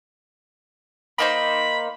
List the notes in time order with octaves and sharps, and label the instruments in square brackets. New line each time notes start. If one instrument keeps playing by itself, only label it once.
[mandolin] A#3 D#4 C5 [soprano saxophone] B5